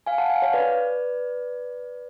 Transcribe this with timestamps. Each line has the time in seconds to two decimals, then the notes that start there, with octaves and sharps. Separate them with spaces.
0.06 F5 G#5
0.18 F#5 A5
0.30 F5 G#5
0.41 C#5 F5
0.53 B4 D5